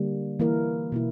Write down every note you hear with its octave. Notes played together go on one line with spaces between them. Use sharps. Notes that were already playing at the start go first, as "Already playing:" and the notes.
Already playing: D3 G3 A#3
E3 A#3 E4 A#4
B2 A#3 E4